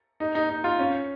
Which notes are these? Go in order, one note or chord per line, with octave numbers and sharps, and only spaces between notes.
D#4
D#4
D#4
F4
C#4